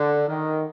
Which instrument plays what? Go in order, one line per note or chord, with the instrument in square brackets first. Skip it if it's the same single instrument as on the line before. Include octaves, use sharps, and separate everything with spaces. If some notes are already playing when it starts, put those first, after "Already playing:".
Already playing: [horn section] D3
D#3